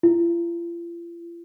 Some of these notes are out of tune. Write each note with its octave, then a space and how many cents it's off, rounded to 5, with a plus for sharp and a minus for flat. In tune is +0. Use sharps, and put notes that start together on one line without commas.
F4 -40